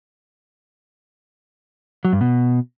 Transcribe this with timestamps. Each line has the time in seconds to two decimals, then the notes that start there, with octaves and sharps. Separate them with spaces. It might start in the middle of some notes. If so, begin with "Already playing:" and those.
2.05 F#3
2.13 G2
2.21 B2